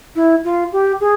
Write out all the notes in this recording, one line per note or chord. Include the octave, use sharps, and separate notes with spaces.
E4
F4
G4
G#4